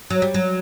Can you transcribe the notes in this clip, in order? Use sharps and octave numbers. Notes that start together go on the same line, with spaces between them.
F#3
G3
F#3